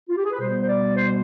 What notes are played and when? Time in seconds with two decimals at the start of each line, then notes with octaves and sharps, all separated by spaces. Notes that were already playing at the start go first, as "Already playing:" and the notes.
0.09 F4
0.17 G4
0.25 G#4
0.32 B4
0.39 B2 G3 B3 C5
0.63 C5
0.67 D5
0.95 C5